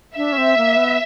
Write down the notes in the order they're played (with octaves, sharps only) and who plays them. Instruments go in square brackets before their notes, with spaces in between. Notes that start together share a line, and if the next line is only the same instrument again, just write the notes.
[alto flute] D4 [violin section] E5
[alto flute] C#4
C4
A#3
B3